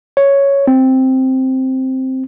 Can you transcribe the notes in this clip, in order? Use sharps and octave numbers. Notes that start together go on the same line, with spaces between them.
C#5
C4